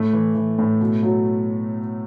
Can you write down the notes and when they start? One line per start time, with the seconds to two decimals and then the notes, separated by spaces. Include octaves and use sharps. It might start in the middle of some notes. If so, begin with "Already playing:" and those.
Already playing: A2 A3
0.13 E3
0.35 E3
0.59 A2
0.81 B2
1.03 F#3